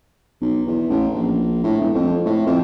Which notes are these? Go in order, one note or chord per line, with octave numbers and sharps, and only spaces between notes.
B1
E2
A1
A#1
A2
E1
F2
A2
F2